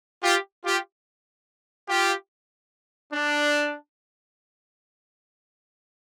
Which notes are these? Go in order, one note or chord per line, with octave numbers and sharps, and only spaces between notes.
F4 G4
F4 G4
F4 G4
D4